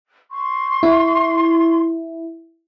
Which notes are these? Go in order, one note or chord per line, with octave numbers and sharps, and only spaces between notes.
C6 C#6
E4